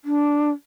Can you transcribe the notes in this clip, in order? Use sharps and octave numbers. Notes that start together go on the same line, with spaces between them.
D4